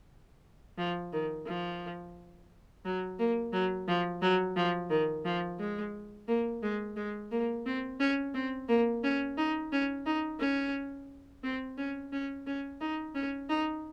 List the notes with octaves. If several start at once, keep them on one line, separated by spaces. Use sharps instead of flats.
F3
D#3
F3
F#3
A#3
F#3
F3
F#3
F3
D#3
F3
G#3
A#3
G#3
G#3
A#3
C4
C#4
C4
A#3
C#4
D#4
C#4
D#4
C#4
C4
C#4
C#4
C#4
D#4
C#4
D#4